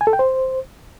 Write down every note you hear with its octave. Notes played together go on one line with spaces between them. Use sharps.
G#5
A4
G5
C5